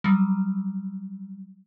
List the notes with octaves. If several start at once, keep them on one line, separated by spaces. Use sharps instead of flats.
F#3 G3